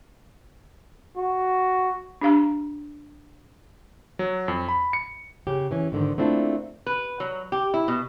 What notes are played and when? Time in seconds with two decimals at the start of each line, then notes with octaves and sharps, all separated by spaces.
1.17 F#4
2.21 D4 G4 F5 A#5
4.19 F#3
4.48 F2
4.68 B5
4.93 C#7
5.47 C#3 C#4 G4
5.71 E3 C#4
5.92 G#2 D3 D#3
6.18 A3 A#3 C4 D4 E4 F4
6.86 B4
7.20 F#3
7.52 G4
7.74 E4
7.88 B2